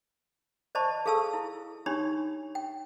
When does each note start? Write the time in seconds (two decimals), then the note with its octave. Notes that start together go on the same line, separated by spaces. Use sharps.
0.75 C5 D5 D#5 A5 B5 C#6
1.06 G#4 A4 F5 A5 C#6 E6
1.33 E4
1.86 D4 D#4 G4 C#5 B5 C6
2.55 G5